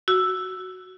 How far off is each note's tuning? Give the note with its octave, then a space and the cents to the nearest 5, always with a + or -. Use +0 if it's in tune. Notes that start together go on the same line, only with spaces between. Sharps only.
F#4 +0 E6 +5